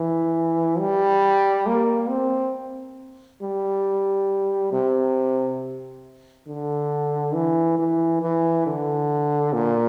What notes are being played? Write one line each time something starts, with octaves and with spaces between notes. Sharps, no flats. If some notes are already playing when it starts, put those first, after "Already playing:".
Already playing: E3
G3
A#3
C4
G3
C3
D3
E3
E3
E3
D3
A#2